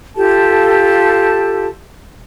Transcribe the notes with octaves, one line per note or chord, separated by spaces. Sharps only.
F4 G4 A4 A5